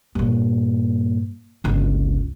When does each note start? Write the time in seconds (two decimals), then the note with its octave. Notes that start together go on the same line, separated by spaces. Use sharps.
0.15 G2 A#2
1.64 G1 C#2